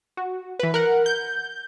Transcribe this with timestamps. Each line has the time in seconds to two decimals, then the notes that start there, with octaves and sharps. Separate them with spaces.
0.17 F#4
0.59 E3 B4
0.74 A#4 F#5
1.06 G6